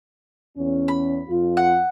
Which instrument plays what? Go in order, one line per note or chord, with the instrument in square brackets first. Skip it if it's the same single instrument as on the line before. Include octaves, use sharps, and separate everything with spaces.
[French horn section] E2 C#4
[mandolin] B5
[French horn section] F2 F4
[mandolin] F#5